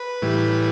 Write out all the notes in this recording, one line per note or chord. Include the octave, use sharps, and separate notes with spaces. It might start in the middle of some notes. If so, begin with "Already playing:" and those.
Already playing: B4
A2 E3 G3